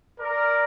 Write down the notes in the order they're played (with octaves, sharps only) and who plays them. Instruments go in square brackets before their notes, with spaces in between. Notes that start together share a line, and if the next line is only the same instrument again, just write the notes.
[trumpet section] A#4 [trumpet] D5